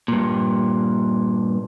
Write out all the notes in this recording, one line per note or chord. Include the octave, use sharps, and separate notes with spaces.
G2 A#2